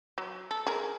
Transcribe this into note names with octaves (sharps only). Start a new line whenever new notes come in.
F#3
A4
G#4 A#4